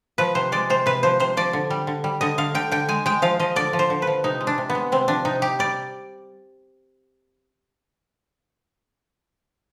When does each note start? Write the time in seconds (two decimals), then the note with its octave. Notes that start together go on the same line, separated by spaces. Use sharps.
0.18 F3 B4
0.35 C3 C5
0.52 G#3 D5
0.70 C3 C5
0.86 C3 B4
1.03 F3 C5
1.20 C3 C5
1.37 F3 D5
1.53 D3
1.70 G3
1.87 D3
2.04 G3
2.21 D3 D#5
2.38 D3 F5
2.55 D3 G5
2.72 D3 G5
2.89 G#3 G#5
3.06 G#3 G5
3.22 F3 F5
3.39 F3 D#5
3.56 D3 D5
3.73 F3
3.79 C5
3.90 D3
4.02 B4
4.07 F3
4.24 C3 D#4
4.41 G#3
4.47 D4
4.58 C3
4.70 B3
4.75 G#3
4.92 C3 C4
5.08 F3 D4
5.25 C3 D#4
5.42 C3 G4
5.59 G3 D5